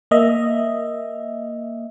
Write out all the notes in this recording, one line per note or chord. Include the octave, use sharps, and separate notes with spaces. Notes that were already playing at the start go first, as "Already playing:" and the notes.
A#3 D#5 E5